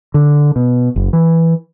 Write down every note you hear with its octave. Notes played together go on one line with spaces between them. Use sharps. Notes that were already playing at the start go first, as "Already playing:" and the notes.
D3
B2
F#1
E3